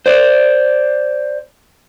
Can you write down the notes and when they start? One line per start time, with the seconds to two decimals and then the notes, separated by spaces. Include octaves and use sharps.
0.06 C5 D5